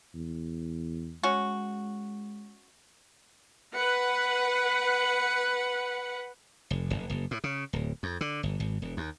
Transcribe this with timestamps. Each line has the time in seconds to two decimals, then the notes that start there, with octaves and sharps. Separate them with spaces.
0.15 E2
1.23 G#3 C#4 F#4
3.75 B4 F#5
6.71 F1
6.90 F1
7.10 F#1
7.31 A2
7.44 C#3
7.73 D1
8.03 F2
8.21 D3
8.43 G1
8.60 G#1
8.82 E1
8.97 D#2